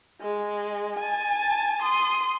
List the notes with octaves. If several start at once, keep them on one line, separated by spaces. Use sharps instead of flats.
G#3
G#5 A5
C6 D#6